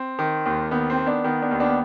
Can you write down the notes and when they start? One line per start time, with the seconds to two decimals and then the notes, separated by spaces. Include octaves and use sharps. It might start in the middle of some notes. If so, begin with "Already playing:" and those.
Already playing: C4
0.19 D#3
0.46 D#2
0.71 D#3 B3
0.90 C4
0.97 D#3
1.06 B3 D4
1.24 D#3 B3
1.42 B3 D4
1.51 D#2
1.59 B3 D4
1.69 B3